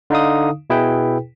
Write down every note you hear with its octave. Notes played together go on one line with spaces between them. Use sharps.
D3 D#4 F5 D#6
B2 E4 G#4 B4 G5